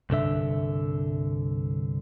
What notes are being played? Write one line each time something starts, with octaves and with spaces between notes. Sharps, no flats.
C2 G2 D3 E5